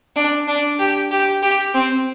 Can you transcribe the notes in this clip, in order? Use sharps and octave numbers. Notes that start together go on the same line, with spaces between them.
D4
D4
G4
G4
G4
C4